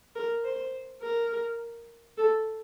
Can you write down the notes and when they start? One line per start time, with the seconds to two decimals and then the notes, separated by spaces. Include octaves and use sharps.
0.16 A#4
0.44 C5
1.02 A#4
2.18 A4